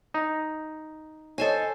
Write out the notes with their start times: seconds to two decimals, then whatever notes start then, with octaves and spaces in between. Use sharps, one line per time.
0.14 D#4
1.38 A4 C5 C#5 D#5 G#5